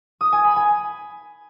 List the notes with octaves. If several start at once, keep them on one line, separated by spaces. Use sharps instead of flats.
D#6
G#5
B5
G#5